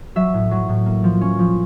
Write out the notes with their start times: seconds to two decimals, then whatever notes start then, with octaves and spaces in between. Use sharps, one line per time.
0.16 F#3 E5
0.34 A2
0.51 F#3
0.69 A2
0.86 A#3
1.04 F3
1.21 C#4
1.39 F3